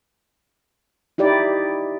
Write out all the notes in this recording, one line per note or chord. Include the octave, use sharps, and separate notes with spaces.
D#4 E4 G4 D5